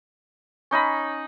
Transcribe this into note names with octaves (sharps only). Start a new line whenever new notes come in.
C#4 D#4 D#5 B5